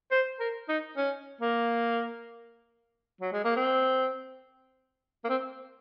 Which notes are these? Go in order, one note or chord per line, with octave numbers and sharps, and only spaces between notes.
C5
A#4
D#4
C#4
A#3
F#3
G#3
A#3
C4
A#3
C4